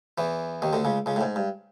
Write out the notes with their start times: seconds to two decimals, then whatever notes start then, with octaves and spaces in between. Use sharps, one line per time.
0.18 E2 E3
0.62 D#2 D#3
0.73 D2 D3
0.85 C#2 C#3
1.06 C#2 C#3
1.16 A2
1.21 G#2
1.36 G2